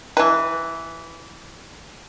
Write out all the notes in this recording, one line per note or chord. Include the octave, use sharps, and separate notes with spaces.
E3 B4